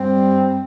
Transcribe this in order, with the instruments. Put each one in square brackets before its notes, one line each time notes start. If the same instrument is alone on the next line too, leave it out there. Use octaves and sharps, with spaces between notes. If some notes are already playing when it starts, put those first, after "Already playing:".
Already playing: [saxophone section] G2 G3 C4